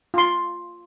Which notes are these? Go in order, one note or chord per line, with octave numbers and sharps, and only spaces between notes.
F4 C6